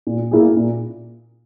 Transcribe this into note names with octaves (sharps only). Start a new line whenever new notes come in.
A#2
A#3 E4 G#4
A#2